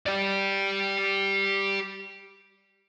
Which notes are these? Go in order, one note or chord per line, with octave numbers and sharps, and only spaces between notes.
G4 D5